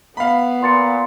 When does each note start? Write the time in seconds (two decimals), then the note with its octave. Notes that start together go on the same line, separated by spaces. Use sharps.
0.17 B3 F5 B5
0.63 A#2 C6 A6 C#7